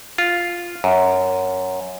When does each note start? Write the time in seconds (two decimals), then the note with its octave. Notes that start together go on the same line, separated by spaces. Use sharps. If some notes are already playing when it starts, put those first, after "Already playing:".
0.18 F4
0.84 F#2